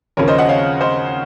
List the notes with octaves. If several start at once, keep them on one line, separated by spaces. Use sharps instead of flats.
D#2 C#3 F3 A#4 C#5
C5 D#5
D#5 F#5
C#5 F5
C5 D#5